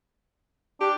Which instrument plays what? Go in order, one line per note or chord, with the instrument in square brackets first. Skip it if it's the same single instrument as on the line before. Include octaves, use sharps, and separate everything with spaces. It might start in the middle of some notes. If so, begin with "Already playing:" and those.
[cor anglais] D4 [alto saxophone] G4